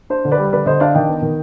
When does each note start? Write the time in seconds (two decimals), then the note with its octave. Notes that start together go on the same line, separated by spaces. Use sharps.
0.10 D4 C5
0.25 D3
0.32 B4 D5
0.38 G3
0.53 D3 B4 D5
0.66 D3 C5 D#5
0.80 D4 D5 F5
0.94 D#3 D#5 G5
1.08 B3
1.22 D#3